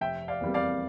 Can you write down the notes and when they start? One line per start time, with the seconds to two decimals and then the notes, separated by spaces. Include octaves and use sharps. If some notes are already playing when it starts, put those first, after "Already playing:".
0.01 F1 E5 G5
0.28 D5 F5
0.41 E2 C3 G3 A#3
0.54 D5 F5